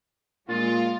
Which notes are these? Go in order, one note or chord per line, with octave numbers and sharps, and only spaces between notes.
A#2 G#3 F4 A6